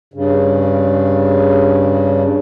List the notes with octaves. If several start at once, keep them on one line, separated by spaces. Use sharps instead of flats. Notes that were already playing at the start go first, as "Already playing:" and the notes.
G2 C#3